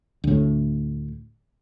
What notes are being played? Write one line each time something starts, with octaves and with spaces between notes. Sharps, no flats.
D2 A2